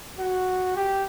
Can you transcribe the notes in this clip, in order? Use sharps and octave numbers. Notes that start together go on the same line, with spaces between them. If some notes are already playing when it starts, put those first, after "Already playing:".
F#4
G4